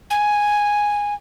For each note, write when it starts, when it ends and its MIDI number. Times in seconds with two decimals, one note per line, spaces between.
0.10 1.14 80